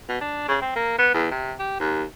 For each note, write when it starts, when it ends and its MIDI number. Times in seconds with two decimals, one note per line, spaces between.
0.09 0.17 47
0.21 0.47 62
0.48 0.57 49
0.62 0.75 60
0.76 0.98 58
0.98 1.09 59
1.14 1.26 40
1.31 1.53 48
1.59 1.77 67
1.79 2.03 39